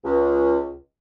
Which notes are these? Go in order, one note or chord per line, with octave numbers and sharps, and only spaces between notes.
C#2